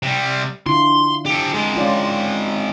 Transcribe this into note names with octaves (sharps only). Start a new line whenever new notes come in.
C3 G3
D3 E4 F4 C6
G4 A4
D#3 G#3
C#4 F4 D5